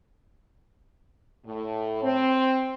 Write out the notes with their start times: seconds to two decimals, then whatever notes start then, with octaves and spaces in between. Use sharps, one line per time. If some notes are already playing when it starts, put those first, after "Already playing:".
1.46 A2
2.02 C4